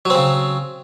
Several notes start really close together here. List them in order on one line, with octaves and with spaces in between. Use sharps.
F#3 C4 C#3